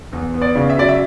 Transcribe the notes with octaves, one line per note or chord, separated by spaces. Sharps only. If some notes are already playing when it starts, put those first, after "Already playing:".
E2
B3
D5
C#3
E5
F#3 D5
E5